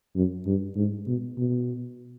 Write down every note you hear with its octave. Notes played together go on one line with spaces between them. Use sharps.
F#2
G2
G#2
B2
B2